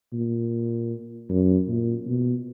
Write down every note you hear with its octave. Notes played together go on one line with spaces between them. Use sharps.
A#2
F#2
A#2
B2